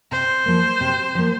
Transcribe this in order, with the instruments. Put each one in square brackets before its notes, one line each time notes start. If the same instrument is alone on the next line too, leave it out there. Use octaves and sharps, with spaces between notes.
[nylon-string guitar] C3 [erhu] C5
[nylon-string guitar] F3 A#3
C3
F3 A#3